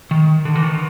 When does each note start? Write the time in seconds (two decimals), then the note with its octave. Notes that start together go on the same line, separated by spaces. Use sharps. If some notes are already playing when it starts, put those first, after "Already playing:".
0.11 D#3
0.45 D3
0.55 E3
0.63 D#3
0.74 D3